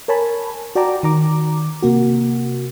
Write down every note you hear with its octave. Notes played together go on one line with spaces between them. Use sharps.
A#4 C#5 G#5 A5 B5
F#4 D5 G5 A5 A#5 D6
D#3 A#5 D6
C3 A#3 F#4